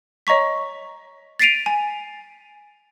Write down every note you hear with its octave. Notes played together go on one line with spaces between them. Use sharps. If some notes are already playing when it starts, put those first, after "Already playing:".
C#5 D#5 A#5 C#6 B6
A6 B6 C7 D7 D#7 F7
G#5